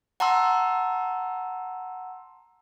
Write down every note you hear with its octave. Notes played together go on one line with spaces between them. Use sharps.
F#5 A5 A#5 C6 E6